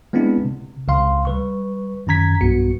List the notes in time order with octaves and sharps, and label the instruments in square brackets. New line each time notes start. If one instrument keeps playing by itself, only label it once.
[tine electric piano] G#3 B3 C4 D4 E4
C3
C#2 C3 F5 C6
G3 B4 C#6
F#2 D#3 C#4 A#5 G#6 B6
B1 G2 B3 F#4 C#7